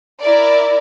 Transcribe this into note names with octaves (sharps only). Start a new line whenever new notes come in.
E4 A#4 D5